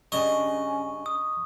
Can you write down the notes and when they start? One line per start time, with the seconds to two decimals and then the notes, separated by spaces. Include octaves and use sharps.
0.12 G2 C#3 C#4 D4 D#5 C#6
1.06 D#6